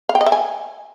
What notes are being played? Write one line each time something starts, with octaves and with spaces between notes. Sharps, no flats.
F5
G5
D#5
E5
G#5